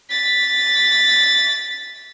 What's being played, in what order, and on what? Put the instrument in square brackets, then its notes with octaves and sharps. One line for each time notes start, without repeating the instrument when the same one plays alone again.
[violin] A6 B6